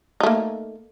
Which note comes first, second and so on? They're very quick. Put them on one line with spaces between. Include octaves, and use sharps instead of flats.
D#4 A3 A#3